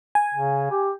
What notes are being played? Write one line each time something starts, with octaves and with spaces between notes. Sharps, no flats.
G#5
C#3
G4